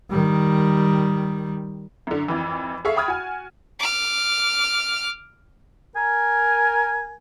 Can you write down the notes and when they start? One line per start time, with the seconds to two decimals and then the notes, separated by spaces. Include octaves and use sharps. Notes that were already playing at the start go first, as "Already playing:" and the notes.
0.10 D#3 G3
2.07 F#2 D3
2.28 G#1 F2 E3
2.85 G#4 A4 E5 F5 C#6
2.96 G5 B5 D#6 F6 G#6 A6
3.08 F#4 G#5
3.80 D6 F6
5.97 A#4 G#5